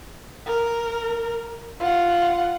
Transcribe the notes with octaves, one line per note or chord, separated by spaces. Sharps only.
A#4
F4 F#5